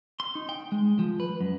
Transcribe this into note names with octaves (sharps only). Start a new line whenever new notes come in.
C6
D#4
G5
G#3
F3
B4
F#2